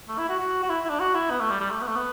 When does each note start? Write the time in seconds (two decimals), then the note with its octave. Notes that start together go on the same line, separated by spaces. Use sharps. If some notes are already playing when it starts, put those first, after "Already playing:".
0.09 A3
0.18 E4
0.29 F#4
0.39 F#4
0.63 F#4
0.70 E4
0.85 E4
0.90 D4
1.00 F#4
1.15 E4
1.30 B3
1.40 A3
1.50 G3
1.60 G3
1.70 A3
1.82 B3
1.88 A3
1.96 B3